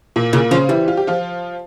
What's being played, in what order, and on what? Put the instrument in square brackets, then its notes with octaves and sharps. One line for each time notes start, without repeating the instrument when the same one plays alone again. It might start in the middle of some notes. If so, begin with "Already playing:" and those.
[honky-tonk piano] A#2 A#3
[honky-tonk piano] A#2 A#3 [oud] C#3
[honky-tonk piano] C#3 C#4 [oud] F3
[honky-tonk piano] E3 E4 [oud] G3
[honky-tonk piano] F4
G4
F3 F4